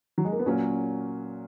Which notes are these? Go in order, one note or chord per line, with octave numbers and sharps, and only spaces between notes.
F#3
G#3
A#3
B3
A#2 F#3 A#3 C#4